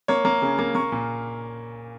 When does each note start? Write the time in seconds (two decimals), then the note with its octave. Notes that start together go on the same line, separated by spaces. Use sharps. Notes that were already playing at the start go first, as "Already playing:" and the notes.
0.08 A#3 C#5
0.25 A#3
0.42 C#3
0.59 A#3
0.75 A#3 C#6
0.92 A#2